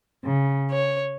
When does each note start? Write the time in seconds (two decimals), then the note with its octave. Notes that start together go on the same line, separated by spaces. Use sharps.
0.24 C#3
0.70 C#5